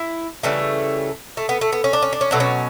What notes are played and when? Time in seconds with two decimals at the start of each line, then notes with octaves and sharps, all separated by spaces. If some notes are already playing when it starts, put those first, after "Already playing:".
Already playing: E4
0.43 C#3 E3 G3 A3
1.37 A3
1.49 B3
1.61 A3
1.72 B3
1.84 C#4
1.93 D4
2.02 C#4
2.13 D4
2.21 C#4
2.31 B2 F#3 A3 D4
2.40 C#4